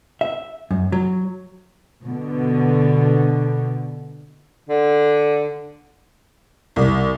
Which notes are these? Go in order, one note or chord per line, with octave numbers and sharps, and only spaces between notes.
E5
F#2
F#3
B2 D3
D3
C2